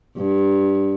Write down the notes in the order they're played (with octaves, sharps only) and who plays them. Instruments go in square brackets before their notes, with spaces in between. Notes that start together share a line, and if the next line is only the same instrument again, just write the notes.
[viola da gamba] G2